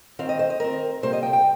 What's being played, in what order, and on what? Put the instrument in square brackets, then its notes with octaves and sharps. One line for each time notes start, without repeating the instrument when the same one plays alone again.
[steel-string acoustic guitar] D#3 C4 F5
D#5
C5
D#5
D#3 C4 A#4
C3 G3 A#3 C5
D#5
G5
G5